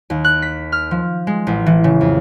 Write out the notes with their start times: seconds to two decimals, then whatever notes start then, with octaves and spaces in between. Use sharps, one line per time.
0.10 D#2
0.25 F#6
0.42 B6
0.72 F6
0.91 F3
1.27 G#3
1.47 A1
1.66 E3
1.84 C#3
2.01 F2